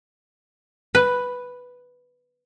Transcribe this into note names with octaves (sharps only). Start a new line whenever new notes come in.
B4